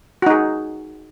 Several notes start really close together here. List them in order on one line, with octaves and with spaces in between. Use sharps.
F#4 D#4 G#4